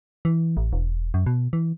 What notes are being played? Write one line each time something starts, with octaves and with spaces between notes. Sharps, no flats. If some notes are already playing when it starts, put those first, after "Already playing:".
E3
A1
E1
F#2
B2
E3